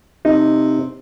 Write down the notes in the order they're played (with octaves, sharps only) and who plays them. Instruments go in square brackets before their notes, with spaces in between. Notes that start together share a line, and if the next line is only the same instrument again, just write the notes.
[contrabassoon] C3 [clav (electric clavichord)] D#4